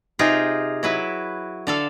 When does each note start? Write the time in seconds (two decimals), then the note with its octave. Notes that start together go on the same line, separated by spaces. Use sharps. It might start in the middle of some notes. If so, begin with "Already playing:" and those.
0.19 C3 D#4 F4 G#4 G5
0.83 F#3 E4 B4
1.67 D3 A4 F5